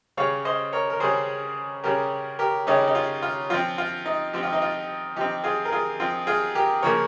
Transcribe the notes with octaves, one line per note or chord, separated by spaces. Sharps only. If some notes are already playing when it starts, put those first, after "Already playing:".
C#3 G3 C#4 C#5 F5
C5 D#5
A#4 C#5
A#4
C#3 G3 C#4 G#4 C5
C#3 G3 C#4 G4 A#4
G4 A#4
C#3 G3 C#4 D#4 G4
D#4
F4
F4
F3 C4 F4
F4
D#4
F3 C4 G4
F4
D#4
F4
F3 C4 D#4 G4
F4 G#4
A#4
F4 G#4
F3 C4 F4
F4 G#4
G4 A#4
C#3 F3 A#3 C#4 A#4 C#5